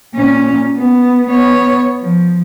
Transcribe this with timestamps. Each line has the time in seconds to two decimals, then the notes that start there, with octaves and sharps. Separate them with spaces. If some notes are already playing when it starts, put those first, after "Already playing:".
0.15 A#2 C#4
0.77 B3
1.29 B3 C#5
2.00 F3